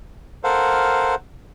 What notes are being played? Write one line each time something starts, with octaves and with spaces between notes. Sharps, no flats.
A4 A#4 C5 F5 F#5